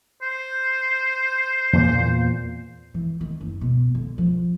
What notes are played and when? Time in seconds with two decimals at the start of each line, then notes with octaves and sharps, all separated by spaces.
0.22 C5
1.73 E2 A#2 A#3
2.94 E3
3.21 D#3
3.41 F#1
3.61 B2
3.95 D3
4.18 F3